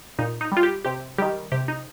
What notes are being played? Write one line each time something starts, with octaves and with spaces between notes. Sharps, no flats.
A#2 D#4
D#4
G3 F4
G4
C3 G4
D#3 G3 G4
C3 G4
D#4